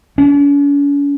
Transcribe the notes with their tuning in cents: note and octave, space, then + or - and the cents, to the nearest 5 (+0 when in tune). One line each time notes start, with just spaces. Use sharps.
C#4 +45